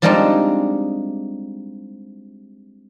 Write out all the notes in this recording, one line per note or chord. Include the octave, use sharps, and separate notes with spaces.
F3 G3 G#3 C4 D4 D#4